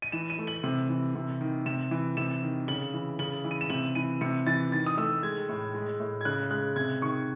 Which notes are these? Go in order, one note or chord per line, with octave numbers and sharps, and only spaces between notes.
D#7
E3 E7
D#7
A3
F#7
C3
E3
C3
D#3
C3 E7
E3
C3 E7
D#3
C#3 F#7
E3
C#3 F#7
E3
D#7
E7
C3 F#7
E3 D#7
C3 C#7
E3 A6
D#3 A6
D#6
A3 E6
G#3 G#6
A2
G#3
A2
G#6
C#3 F#6
G#3 F#6
C3 G#6
D#3 C#6